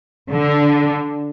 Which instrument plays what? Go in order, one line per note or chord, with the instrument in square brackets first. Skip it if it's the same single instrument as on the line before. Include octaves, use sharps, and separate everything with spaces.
[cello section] D3